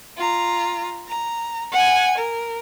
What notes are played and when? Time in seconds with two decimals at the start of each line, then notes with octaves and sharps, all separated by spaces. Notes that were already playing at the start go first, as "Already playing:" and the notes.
0.17 F4 A#5
1.08 A#5
1.72 F#5 G#5
2.18 A#4